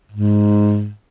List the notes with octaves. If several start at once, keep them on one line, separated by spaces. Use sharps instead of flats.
G#2